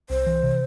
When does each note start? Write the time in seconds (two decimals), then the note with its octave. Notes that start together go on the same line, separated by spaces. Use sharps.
0.10 C2 C5
0.26 E3
0.43 C3